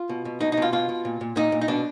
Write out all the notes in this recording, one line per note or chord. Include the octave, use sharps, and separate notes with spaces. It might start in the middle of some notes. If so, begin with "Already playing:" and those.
Already playing: F4
B2
B2
B2 D#4
D#4
B2 F4
B2 F4
B2
A#2
A#2
A#2 D#4
A#2
D#4
B2 D4